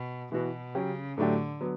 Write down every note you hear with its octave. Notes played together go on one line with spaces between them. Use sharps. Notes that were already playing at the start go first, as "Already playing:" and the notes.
Already playing: B2
B2 E3 B3 F#4
C#3 F#3 C#4 G4
A2 D3 F#3 A3 D4 G4
F#3 B3